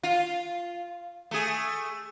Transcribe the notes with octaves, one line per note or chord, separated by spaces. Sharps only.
F4
A3 G#4